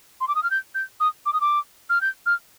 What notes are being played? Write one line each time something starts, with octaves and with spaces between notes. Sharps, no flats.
C6
D6
D#6
F6
G6
G6
D#6
D6
D#6
D6
F6
G6
F6